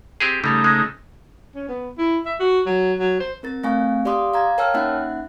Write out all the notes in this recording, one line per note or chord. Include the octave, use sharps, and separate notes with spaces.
C4 G4 G#4
C#3 G3 A3 D#4
G#3
C#4
B3
E4
E5
F#4
F#3
F#3
C5
C4 A#4 A6
A3 C4 F5 G#5 C#6
G4 D5 F5 C6 D6 D#6
F5 A#5 G#6
A#4 C#5 G5 A5 E6 F6
A#3 C#4 D#4 E5 F#5 F#6